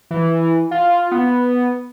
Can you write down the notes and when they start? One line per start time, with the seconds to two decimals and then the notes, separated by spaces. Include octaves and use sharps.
0.11 E3
0.71 F4
1.12 B3